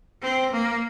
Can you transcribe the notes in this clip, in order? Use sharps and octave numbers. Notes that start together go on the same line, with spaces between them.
C4
A#3